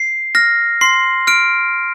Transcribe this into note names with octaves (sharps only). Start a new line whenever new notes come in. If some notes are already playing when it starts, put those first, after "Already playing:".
Already playing: C7
F6 A#6
C6 C7
F6 D7